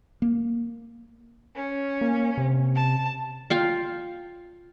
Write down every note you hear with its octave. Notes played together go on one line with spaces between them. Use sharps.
A#3
C#4
A#3
C3
A5
F4 F5 G5